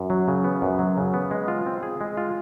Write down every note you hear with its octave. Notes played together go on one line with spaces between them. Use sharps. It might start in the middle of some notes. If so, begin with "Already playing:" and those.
Already playing: F#2
F#3
C#3
B3
F#2
F#3
C#3
B3
G#3
F4
C4
G#4
G#3
F4